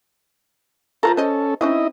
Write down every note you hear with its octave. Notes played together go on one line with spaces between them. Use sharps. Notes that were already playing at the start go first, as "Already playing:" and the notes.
F3 F4 A4 A#4 A5 A#5
C#4 A4 C5 D#5
C4 C#4 D#4 E4 D#5